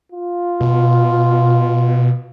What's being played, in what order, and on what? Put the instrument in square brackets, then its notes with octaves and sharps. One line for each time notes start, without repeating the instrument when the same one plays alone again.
[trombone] F4
[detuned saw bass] B2